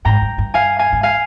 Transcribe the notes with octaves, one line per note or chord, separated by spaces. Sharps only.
G#2 G5 A#5
G2
G2
F5 G#5
F5 G#5
G#2
F5 G#5